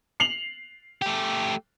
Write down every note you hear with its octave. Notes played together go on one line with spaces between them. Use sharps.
C7 F7 F#7
A3 G4